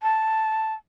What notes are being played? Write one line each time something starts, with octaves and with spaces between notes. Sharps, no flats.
A5